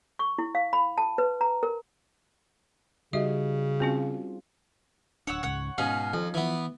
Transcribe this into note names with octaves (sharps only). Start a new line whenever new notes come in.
C#6
E4
F5
B5
A5
B4
A#5
A#4
C#3 G3 D#4 F#4 G4 D#5 E5
C4 C#4 F4 F#4 G#4 C5
D1 D4 C#5 F#5 E6
C#2 G#2 C#3 C#5 F#5
G#2 B2 C#4 D#4 F5
F2 F3
E3 B3